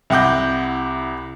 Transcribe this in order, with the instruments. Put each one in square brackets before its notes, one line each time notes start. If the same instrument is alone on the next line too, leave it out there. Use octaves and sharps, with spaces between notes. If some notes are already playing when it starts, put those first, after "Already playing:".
[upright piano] C2 E4 F#5 D6 G6